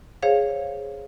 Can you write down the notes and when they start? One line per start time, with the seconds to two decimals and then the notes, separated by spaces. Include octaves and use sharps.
0.23 G#4 C5 C#5 F5